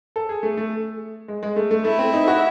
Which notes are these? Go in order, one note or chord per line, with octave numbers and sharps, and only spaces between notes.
A4
G#4
A3
A3
G#3
G#3
A3
A3
A3 E4
C4
D#4
F#4